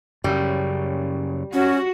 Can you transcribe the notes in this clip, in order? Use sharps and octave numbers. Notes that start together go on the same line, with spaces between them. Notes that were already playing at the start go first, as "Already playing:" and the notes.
F#2 C#3 G3
C#4 F#4